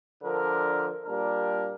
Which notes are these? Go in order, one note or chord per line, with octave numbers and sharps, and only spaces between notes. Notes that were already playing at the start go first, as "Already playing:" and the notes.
D3 F3 D4 A#4
A#2 G3 A#3 D4 A#4